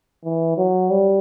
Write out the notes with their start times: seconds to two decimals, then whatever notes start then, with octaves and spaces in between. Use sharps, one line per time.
0.24 E3
0.57 F#3
0.90 G3